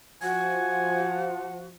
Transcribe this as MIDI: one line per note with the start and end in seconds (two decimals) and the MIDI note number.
0.22 1.75 53
0.22 1.67 66
0.22 1.55 78
0.22 1.24 80